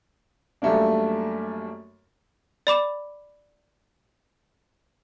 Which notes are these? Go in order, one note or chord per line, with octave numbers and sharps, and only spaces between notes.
F#2 G3 A3 A#3 D4
D5 B5 D6 E7